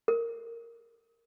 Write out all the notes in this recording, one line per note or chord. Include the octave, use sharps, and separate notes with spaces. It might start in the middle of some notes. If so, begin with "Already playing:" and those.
A#4